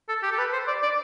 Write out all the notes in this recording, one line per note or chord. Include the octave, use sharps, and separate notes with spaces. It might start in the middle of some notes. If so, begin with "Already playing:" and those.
A4
G4
A4
B4
C5
D5
D5